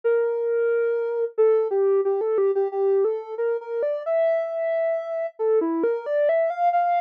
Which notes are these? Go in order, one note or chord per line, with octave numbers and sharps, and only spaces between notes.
A#4
A4
G4
G4
A4
G4
G4
G4
A4
A#4
A#4
D5
E5
A4
E4
A#4
D5
E5
F5
F5